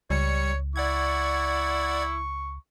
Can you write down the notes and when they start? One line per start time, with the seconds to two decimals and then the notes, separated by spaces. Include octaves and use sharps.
0.10 C#2 G3 C#5 C#7
0.76 E4 D5 F#5 C#6 G#6